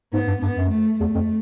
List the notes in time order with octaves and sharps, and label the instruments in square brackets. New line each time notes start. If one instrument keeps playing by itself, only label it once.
[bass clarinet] G#2 [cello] B3
[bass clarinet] G2
[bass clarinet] G2 [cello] B3
[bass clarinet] F#2
[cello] A3
[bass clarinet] E2 [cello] A3
[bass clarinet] F2